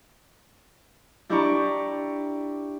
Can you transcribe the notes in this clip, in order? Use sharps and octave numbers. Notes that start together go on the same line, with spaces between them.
D4 E4 G4 D5 A#5 C#6